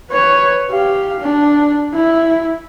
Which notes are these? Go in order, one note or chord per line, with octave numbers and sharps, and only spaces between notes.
B4 C#5
G4 F5
D4
E4